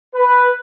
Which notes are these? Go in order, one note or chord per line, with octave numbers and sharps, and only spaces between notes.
B4